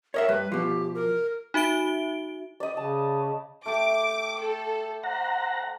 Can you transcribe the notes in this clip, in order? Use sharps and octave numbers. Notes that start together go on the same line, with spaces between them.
A#4 C#5 D#5 E5
G2 B4
B2 F3 G4
A#4
D#4 F#4 E5 D7 G7
D5 D#5
C#3 A5
A3 G4 D6
A4
C5 F#5 A#5